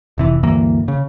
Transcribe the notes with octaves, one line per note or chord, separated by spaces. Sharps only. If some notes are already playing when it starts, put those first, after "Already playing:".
F1 C3 E3
D2 G2 E3 A#3
C#3